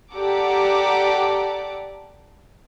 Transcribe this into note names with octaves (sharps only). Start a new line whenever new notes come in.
G4 A4 D5 F#5 A#5 D6